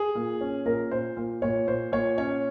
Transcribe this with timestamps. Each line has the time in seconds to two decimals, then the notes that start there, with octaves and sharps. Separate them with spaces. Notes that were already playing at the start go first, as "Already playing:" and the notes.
Already playing: G#4
0.15 A#2
0.41 C#4
0.65 A#2 A#4
0.91 A#2 C5
1.17 A#2
1.42 A#2 C#5
1.67 A#2 C5
1.92 A#2 C#5
2.18 C#4 C#5